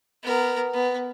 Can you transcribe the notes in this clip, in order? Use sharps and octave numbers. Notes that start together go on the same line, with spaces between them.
B3 A#4
B3